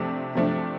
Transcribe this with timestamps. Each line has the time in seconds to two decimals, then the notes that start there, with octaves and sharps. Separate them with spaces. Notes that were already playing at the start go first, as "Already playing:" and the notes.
Already playing: C3 F3 A3 D4
0.35 C3 F3 A3 D4